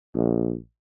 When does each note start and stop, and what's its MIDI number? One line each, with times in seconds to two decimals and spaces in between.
0.14 0.55 34